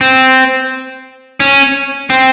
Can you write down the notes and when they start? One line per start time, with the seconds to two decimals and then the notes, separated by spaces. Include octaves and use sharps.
0.01 C4
1.40 C#4
2.10 C4